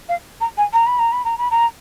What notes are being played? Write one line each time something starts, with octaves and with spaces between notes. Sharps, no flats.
F5
A#5
G#5
A#5
B5
A#5
B5
A#5
B5
A#5